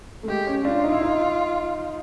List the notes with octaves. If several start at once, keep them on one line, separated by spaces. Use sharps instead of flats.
A3
G#3 G4
C#4
D4 F4
D#4
E4
D#4